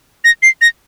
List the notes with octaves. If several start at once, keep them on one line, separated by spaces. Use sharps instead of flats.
A#6
C7
A#6